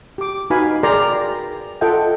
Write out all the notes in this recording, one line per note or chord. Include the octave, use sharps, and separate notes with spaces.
G4 D6
D#4 F#4 B4 F5 G#5 B5
G#4 A#4 D5 G5 A#5 C6
F4 A4 D#5 E5 F#5 G5